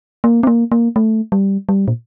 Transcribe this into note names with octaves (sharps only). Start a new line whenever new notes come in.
A#3
C4
A#3
A#3
A3
G3
G3
A#2